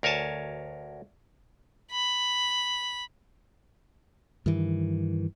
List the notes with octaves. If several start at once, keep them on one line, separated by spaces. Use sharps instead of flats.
D2 A#4 C#5 G#5 A5
B5
G2 D#3 E3